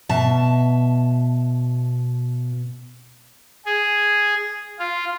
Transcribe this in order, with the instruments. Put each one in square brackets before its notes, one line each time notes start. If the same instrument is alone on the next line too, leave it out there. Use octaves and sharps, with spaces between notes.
[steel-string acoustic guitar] B2 E5 A5
[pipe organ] G#4
F4